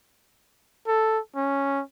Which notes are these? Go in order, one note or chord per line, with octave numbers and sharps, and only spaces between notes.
A4
C#4